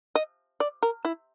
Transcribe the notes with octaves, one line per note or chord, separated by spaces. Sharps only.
D#5
D5
A#4
E4